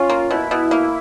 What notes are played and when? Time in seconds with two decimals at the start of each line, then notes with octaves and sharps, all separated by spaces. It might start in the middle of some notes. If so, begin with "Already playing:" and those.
Already playing: C#4 F4
0.10 A#3
0.30 B2 E4
0.51 B2
0.71 A#3